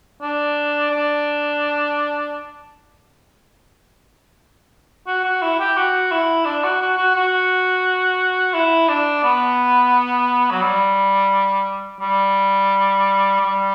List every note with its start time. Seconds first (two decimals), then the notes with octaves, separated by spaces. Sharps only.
0.21 D4
0.91 D4
5.07 F#4
5.24 F#4
5.42 E4
5.59 G4
5.77 F#4
6.11 E4
6.45 D4
6.63 F#4
6.81 F#4
6.97 F#4
7.15 F#4
8.54 E4
8.88 D4
9.23 B3
10.51 F#3
10.61 G3
12.01 G3
13.40 G3